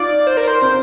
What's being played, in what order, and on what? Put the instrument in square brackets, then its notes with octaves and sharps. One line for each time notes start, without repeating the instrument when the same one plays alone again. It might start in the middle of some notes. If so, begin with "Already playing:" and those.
Already playing: [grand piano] D#4 F4 [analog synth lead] D5
[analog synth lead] C5
A#4
C5
[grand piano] C4